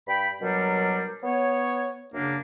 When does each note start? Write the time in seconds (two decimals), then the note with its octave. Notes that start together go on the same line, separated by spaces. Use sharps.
0.07 G2 G5 B5
0.41 B2 F#3 G3 D4 A#4
1.23 B3 C#5
2.13 F#2 C#3 A#3 D4